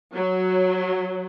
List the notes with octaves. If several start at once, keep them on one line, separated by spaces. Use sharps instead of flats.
F#3